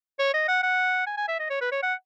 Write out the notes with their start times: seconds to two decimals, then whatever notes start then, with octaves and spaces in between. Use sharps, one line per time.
0.19 C#5
0.34 D#5
0.48 F#5
0.63 F#5
1.06 G#5
1.17 G#5
1.28 E5
1.39 D#5
1.50 C#5
1.61 B4
1.72 C#5
1.83 F#5